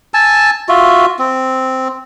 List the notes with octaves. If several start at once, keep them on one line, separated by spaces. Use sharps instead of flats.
G#5 A5 E6
F4 F#4 E5
C4